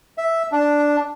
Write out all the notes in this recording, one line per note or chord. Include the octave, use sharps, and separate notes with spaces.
E5
D4